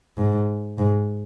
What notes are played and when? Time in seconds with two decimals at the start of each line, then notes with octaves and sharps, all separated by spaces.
0.18 G#2
0.78 G#2